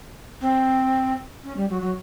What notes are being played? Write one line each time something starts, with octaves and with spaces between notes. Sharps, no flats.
C4
C#4
G3
F#3
F#3